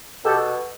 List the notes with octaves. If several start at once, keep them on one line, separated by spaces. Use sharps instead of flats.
B2 G4 A4